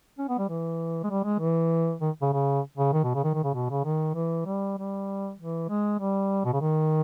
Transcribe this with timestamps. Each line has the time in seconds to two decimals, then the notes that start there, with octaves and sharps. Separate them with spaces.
0.18 C#4
0.29 B3
0.39 G3
0.49 E3
1.04 G#3
1.10 G3
1.24 G#3
1.40 E3
2.01 D#3
2.22 C#3
2.33 C#3
2.77 C#3
2.93 D#3
3.04 B2
3.14 C#3
3.24 D#3
3.34 D#3
3.44 C#3
3.54 B2
3.70 C#3
3.85 D#3
4.15 E3
4.46 G3
4.78 G3
5.39 E3
5.69 G#3
5.99 G3
6.45 B2
6.53 C#3
6.61 D#3